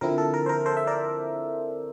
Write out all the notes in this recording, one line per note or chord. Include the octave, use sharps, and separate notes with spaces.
D3 F3 C4 E4 A#4
A4
A#4
C5
A#4
A4 C5
E5
A#4 D5